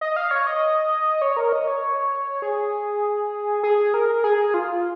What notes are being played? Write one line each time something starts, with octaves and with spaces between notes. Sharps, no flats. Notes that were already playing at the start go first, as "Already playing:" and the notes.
D#5
F5
C#5
D#5
C#5
A#4
D#5
C#5
G#4
G#4
A#4
G#4
F4